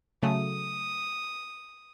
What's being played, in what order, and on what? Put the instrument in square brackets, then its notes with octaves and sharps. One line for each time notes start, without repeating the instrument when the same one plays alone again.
[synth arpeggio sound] C#3 F#3 A3 [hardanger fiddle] D#6